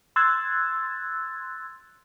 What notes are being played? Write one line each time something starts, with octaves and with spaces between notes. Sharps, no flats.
C6 E6 F#6 G#6 A6